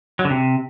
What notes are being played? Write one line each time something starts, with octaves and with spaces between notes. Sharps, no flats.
F#3
D3
C3